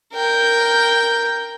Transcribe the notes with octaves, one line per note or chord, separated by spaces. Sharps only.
A#4 G5